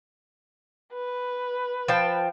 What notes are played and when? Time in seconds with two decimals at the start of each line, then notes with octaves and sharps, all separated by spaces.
0.94 B4
1.88 F3 G5 A5